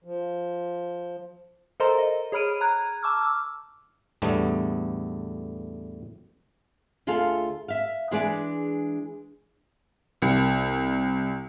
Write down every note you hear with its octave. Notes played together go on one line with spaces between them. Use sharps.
F3
A4 A#4 C5 D#5 A#5 C6
D#5
G#4 C#5 B5 F6 D7 D#7
A#5 F#6 G#6
A5 C#6 D6 E6 F6
D6 E6 F6
E2 A2 D3 G3 A3 B3
D2 F4 G#4 A4 F5
E5 F5
E3 G#3 D4 G#4 B4 D5
C2